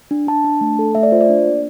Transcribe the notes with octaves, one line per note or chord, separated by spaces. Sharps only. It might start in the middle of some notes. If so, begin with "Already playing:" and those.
D4
D4 A5
D4
A3
A4
A3 E5
D5
F4 C5
D5
D4
A#3